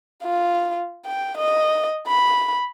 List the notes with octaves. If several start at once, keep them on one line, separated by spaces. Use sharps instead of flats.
F4
G5
D#5
B5